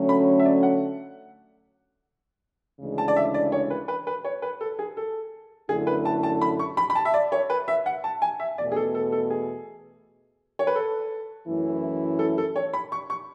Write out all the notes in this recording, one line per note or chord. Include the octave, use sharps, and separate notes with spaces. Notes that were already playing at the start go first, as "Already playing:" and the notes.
Already playing: D3 F#3 A3 C#4
B5
E5
D5
F#5
D2 C#3 E3 G#3 D4
A5
D5
E5
D5
C#5
B4
B4
B4
C#5
B4
A4
G#4
A4
F#2 D3 A3 E4 G#4
B4
A5
A5
B5
C#6
B5
B5
A5
E5
D5
C#5
B4
E5
F#5
A5
G#5
E5
E2 B2 A3 D5
G#4
A4
A4
A4
G#4
C#5
B4
A4
F#2 E3 A3 C#4 E4
A4
A4
C#5
B5
C#6
C#6